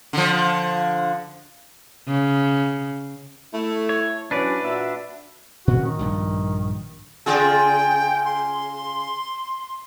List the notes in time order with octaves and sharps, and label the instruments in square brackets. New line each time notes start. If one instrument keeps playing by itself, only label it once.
[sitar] D3 F3
[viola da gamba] C#3
[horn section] A3 E4
[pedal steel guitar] C#5
[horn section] E3 F#3 C#4 [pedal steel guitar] D4 B4 D5
[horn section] A#2 F#4 E5
[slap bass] A#2 C#4 [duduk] F#4
[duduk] D#3
[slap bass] A#1 G2 A#2
[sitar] C#3 F4 G#4 [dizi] G5
[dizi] C6